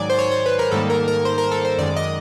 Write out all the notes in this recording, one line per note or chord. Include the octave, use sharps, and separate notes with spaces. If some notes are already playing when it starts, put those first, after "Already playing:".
Already playing: G#2 D#3 F#3 D5 G#5
C5
C#5
C5
B4
A#4
G#2 D#3 G3 A#3 A4
A#4
A#4
C5
A#4
A4
C5
F#2 D#3 G#3 D5
D#5